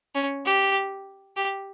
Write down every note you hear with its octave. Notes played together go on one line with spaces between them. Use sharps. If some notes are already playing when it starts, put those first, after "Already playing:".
C#4
G4
G4